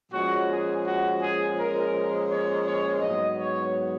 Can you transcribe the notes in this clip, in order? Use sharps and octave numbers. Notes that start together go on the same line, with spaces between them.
A#2 F3 G#3 C#4 F#4
G#4
F#4
G#4
A#4
C#5
C#5
G#2 F#3 B3 D#5
C#5